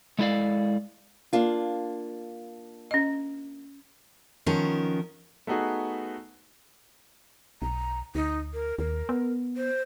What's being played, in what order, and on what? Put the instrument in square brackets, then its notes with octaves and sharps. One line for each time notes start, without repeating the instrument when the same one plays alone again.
[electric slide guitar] G#3 A3 E4 A4 D5 F5
[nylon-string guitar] A#3 D4 F4
[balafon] C#4 D#5
[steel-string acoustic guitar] D#3 F3 B3 C#4 A#4
[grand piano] A3 B3 D#4 F#4 G#4
[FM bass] B1 [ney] A#5
[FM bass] D2 [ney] D#4
[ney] A#4
[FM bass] D#2 [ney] A#4
[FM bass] B3
[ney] C5